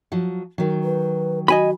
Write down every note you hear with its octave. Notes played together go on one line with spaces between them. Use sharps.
F3 F#3
D#3 F#3
B4
F#4 D#5 G#5 B5